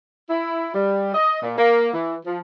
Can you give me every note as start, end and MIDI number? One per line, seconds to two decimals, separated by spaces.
0.30 0.73 64
0.74 1.13 55
1.14 1.40 75
1.42 1.57 46
1.58 1.89 58
1.94 2.15 52
2.26 2.39 53